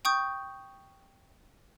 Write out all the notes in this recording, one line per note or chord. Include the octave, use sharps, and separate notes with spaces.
G5 C#6 D#6 G6